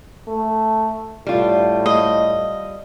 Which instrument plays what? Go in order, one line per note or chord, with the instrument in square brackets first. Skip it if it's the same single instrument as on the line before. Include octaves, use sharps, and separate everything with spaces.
[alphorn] A3
[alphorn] A2 [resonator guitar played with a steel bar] G3 F4
[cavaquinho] D#5